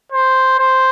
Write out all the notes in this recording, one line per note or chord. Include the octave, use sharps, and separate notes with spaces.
C5
C5